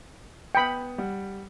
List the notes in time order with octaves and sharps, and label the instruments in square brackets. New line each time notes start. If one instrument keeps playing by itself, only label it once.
[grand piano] B3 D#6 C#7 [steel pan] G5 B5
[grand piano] G3 F#5